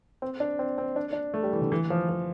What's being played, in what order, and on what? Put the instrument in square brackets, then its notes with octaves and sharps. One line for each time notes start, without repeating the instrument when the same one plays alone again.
[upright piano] C4
D4
C4
C4
D4
D4
A3
G3
E3
D3
E3
F3
F3